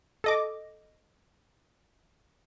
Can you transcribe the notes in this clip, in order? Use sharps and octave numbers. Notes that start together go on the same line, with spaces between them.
A4 D#5 D6